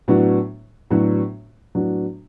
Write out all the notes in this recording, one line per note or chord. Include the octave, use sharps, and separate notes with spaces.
A2 F#3 B3 D4 F#4
A2 F#3 B3 D4 F#4
A2 F#3 B3 D4 F#4